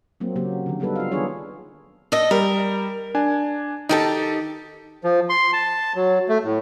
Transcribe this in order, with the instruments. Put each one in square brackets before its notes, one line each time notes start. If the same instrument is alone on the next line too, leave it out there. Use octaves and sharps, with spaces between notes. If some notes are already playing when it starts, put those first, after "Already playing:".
[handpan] F#3 A#3 C4
C#3 F#3 A#3 G4
D3 D#3
G3 B3 D#4 A4 B4
F4 F5
D#3 B3 D4 G#4 C#5
[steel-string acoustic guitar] A4 D#5
[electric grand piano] G3 [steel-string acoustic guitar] A#4
[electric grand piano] D4 G#5
[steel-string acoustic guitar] D#3 G4 A5 [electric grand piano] D#4 A4
[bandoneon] F3
C6
A5
F#3
A3
A2